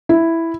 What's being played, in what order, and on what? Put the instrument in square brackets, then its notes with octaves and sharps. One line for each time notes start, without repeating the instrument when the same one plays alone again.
[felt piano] E4